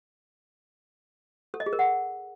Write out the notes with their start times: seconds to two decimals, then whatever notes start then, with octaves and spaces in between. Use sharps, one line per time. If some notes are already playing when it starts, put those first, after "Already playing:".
1.54 A4
1.60 D#5
1.66 G#4
1.73 A#4
1.79 F#5